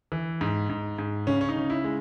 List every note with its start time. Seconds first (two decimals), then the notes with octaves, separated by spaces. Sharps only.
0.12 E3
0.41 G#2
0.69 G#2
0.98 G#2
1.27 C#3 C#4
1.41 C#4
1.49 D#4
1.56 C#3
1.70 E4
1.84 G#3